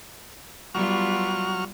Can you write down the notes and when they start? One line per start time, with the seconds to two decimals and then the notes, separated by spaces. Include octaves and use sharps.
0.75 F#3 G3 B3 F4 C#6 F6